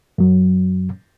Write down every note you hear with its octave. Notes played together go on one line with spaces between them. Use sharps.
F#2 F#3